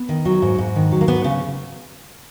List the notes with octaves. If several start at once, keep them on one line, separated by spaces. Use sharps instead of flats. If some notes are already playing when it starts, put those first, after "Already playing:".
Already playing: B3
D#3
F#3
G#2
G#2
D#3
F#3
A#3
G#2 B3
C#3 C#4